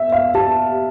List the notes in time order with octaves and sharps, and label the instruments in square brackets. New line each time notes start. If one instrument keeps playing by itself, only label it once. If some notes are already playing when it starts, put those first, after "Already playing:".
Already playing: [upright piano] E5
F5
[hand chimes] G4 [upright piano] A5